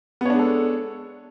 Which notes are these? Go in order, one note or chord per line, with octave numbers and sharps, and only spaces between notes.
G#3 B3 D4 A4 C#5